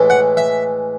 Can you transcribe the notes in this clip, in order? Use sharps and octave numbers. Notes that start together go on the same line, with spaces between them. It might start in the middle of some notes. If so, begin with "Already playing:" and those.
Already playing: A2 E3 G#3
F#5
E5